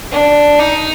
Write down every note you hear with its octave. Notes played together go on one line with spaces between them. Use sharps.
D4
D#4